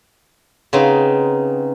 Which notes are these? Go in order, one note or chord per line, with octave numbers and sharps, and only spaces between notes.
C#3 B3 C4 D#4